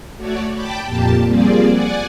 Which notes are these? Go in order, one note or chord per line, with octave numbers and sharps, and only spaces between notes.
A3 F#4 C#5 D5
G5 A5 B5 D6
F2 A#2 A#3 G4 A5
F3 G3 A#3 C4 G#4 D5
D5 F#5 G#5